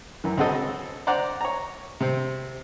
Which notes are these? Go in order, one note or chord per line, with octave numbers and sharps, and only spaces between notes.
F#2 E3
C#2 C4 F#4 A4 D#5
C5 D5 F#5 A#5
C#5 A#5
C3 C4